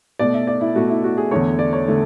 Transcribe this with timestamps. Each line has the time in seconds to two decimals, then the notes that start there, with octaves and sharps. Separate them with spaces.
0.19 B2 A3 D5
0.34 E5
0.47 D5
0.61 E4
0.76 B2 A3 F#4
0.90 E4
1.04 F#4
1.17 G#4
1.31 E2 D3 A3 C#5
1.59 D5
1.73 C#5
1.88 D3 A3